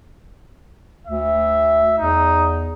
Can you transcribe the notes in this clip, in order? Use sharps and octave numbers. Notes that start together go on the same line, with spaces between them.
D2 E5
E2 D#4